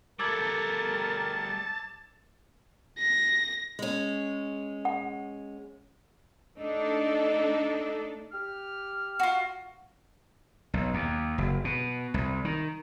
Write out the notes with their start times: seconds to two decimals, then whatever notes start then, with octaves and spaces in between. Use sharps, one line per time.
0.19 G3 A3 A#4 A5 D6 E6 G#6
2.99 A#6
3.79 G#3 C#4
4.85 F#5
6.58 A3 D4 D#4 A4
8.32 G4 F6
9.20 F4 F#4
10.74 B1
10.94 D#2
11.38 F#1
11.64 B2
12.14 C2
12.45 D#3